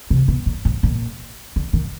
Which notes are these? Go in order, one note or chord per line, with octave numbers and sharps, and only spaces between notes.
C3
B2
A#2
A2
A#2
D3
D#3